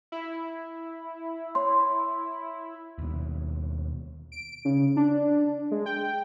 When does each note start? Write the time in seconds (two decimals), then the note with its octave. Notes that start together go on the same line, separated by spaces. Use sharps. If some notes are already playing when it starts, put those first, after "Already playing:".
0.12 E4
1.55 C#5 C6
2.98 D#2 B2
4.32 D7
4.65 C#3
4.96 D4
5.71 G#3
5.86 G5